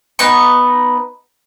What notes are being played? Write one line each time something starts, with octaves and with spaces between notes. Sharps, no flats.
B3 D#4 C#6